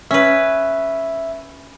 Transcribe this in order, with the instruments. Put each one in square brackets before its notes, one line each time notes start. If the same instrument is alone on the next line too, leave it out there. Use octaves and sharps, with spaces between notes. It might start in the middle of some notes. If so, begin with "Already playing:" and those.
[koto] C#4 B4 [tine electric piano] E5